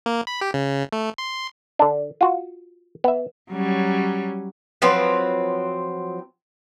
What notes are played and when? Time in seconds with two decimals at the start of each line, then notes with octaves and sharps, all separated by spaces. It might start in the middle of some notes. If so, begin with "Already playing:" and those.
0.06 A#3
0.27 B5
0.41 G4
0.54 C#3
0.93 A3
1.18 C6
1.79 D3 D4
2.21 F4 F#4
3.04 B3 E5
3.52 F#3 G3 C#4
4.82 F3 F#3 C4 B4